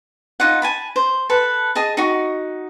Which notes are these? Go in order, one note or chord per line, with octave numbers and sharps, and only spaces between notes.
D#4 F4 F#5
G#5 A5 B5
C5
A4 B4 A5
G#4 D#5 A5
D#4 F#4